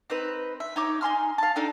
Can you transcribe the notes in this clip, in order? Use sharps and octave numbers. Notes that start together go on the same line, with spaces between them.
C4 D#4 B4
E5
D#4 C#5 D6
D#4 G#5 C6 F6
F5 A5
D4 D#4 A4 G5